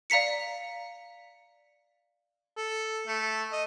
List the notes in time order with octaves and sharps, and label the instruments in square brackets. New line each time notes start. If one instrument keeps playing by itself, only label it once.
[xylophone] D5 F5 A#5 B6 C#7
[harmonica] A4
A3
D#5